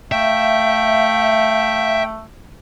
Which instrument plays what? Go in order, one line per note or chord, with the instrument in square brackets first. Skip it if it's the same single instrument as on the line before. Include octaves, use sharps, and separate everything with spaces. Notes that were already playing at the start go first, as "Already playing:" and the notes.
[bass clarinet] A3 [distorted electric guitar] E5 [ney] F5 [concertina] G5